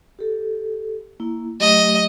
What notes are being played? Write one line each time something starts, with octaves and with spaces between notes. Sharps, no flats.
G4 A4
A#3 E4
F#3 A3 G4 D#5